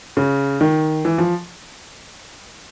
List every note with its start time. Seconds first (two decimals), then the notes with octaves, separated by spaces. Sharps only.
0.17 C#3
0.61 D#3
1.05 E3
1.18 F3